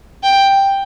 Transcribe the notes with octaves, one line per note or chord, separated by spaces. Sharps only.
G5